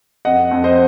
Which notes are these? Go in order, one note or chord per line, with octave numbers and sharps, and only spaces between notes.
F2 D#5 F#5
F2
C5 D#5